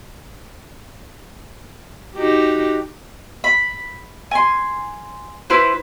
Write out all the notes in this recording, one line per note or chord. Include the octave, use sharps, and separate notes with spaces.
D#4 F#4 G4
B5
G#5 C6
E4 B4 C5